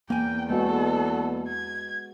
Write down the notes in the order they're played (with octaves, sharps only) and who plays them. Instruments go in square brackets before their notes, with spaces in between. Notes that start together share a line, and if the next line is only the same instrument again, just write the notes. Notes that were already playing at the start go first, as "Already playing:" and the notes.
[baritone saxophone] E2 [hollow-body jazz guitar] A#3 G#5 [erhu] G5
[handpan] G#3 B3 F#4 [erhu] A4
[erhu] G#6